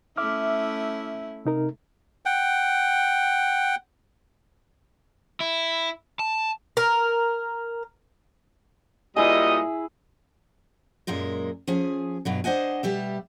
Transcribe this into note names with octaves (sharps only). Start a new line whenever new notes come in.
A3 C#4 E4 E5 D6 F6
C3 D#4 A#4
F#5 G5
E4
A5
A#4
A#2 G3 E4 G#4 D#5
F#2 A#2 G#3 A#4
F3 C#4 G#4 G#5
G2 B2 F#3
D4 C5 D#5 F#5 G#5
B2 G3 G4 E5